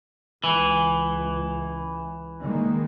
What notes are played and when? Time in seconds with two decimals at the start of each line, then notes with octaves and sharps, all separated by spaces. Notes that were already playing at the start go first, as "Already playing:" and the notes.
0.44 C#2 E3
2.43 D#3 G#3 A#3